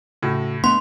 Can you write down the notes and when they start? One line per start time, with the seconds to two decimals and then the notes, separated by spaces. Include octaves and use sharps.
0.23 A2 C#3 F#4
0.64 A3 B3 D4 C6